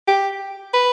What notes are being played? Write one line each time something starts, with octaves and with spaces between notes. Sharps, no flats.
G4
B4